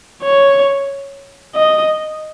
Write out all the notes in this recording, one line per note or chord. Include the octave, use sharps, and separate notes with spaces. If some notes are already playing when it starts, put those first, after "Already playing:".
C#5
D#5